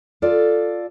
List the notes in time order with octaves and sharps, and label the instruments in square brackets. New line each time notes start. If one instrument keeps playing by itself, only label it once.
[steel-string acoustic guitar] F4 A4 D5